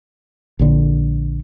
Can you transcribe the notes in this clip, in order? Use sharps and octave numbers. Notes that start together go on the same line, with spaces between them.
A#1 D3